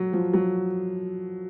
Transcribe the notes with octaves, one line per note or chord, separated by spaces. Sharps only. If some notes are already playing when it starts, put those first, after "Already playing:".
Already playing: F#3
F3
F#3